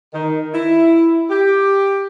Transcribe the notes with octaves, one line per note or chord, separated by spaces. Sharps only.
D#3
E4
G4